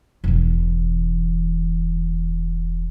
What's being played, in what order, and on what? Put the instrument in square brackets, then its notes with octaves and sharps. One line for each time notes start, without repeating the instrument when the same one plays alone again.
[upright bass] E1 E3